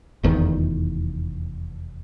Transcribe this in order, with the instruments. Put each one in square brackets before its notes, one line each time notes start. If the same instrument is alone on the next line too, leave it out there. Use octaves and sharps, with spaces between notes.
[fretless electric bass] F1 E2 D#3